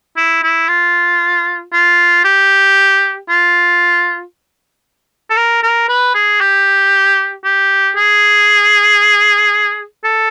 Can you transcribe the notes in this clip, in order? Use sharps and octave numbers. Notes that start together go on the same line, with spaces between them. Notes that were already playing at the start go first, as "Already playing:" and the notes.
E4
E4
F4
F4
G4
F4
A4
A#4
A#4
B4
G#4
G4
G4
G#4
A4